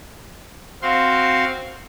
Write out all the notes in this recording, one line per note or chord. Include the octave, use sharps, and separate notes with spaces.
C4 F#4 F5 C6